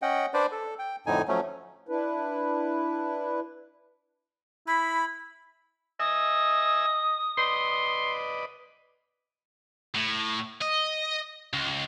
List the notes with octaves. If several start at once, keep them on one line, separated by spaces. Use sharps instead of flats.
C#4 D#5 F#5 G5
D4 B4 C5 D5
A4
G5
F2 A2 D3 D#4 G#5
F3 F#3 A3 C#4
D4 E4 B4
E4 B5
D#5 E5 G#5 D#6 E6
B4 D5 D#5 C6
A2
D#5
C#2